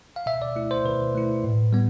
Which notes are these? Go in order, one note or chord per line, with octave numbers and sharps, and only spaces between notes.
F5
B2 E5
D5
A3 E4
C5
B2 B4
A3 E4
A2
G3 B3